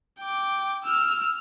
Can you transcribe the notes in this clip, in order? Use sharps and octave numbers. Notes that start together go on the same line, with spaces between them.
G5 D6
E6 F6